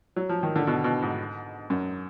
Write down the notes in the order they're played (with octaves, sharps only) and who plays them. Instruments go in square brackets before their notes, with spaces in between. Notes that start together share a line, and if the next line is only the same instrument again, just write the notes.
[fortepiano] F#3
F3
D#3
D3
B2
B2
G#2
F#2